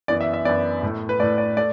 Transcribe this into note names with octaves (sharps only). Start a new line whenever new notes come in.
F#2 E3 B3 D5
E5
E5
F#2 E3 B3 D5
A2 A3
B4
A2 A3 D5
D5
A3 D5